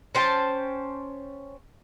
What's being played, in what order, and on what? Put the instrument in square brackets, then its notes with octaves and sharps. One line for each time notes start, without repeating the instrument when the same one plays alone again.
[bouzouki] C#4 C5 G5 A5